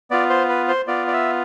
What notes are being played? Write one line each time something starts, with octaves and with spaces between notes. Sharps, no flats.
B3 F4 D5
C5
B4
C5
B3 F4 D5
D5
E5